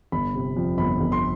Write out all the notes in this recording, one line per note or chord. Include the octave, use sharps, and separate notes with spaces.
G1 B5
C3
F2
G1 B5
G1
C6